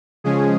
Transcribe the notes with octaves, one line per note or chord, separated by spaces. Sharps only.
C#3 F3 G#3 C#4 G#4